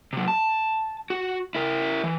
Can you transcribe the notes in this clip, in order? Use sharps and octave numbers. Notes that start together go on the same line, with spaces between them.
C3 F#3
A5
F#4
E4 A#4
E3